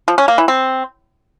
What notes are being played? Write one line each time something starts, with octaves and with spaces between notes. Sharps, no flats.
F3
C#4
A#3
E3
C4